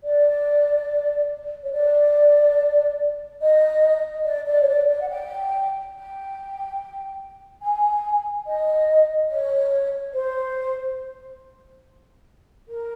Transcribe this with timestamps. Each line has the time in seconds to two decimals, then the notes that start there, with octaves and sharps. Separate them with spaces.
0.04 D5
1.63 C#5
1.72 D5
3.41 D#5
4.25 D5
4.46 D5
4.62 C#5
4.67 D5
4.88 D5
5.01 F#5
5.09 G5
5.93 G5
7.61 G#5
8.46 D#5
9.30 C#5
10.14 C5
12.67 A#4